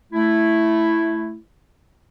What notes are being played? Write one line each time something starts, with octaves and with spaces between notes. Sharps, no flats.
A3 E4